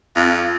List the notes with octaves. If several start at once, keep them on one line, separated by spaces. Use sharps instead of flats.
F2